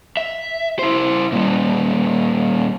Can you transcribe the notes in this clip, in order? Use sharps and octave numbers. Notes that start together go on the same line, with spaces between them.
E5
E4 C5
A#2 G3